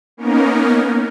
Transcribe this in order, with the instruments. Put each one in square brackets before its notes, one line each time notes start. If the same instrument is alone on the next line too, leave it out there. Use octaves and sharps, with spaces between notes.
[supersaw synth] A#3 B3 C#4 D#4 A#4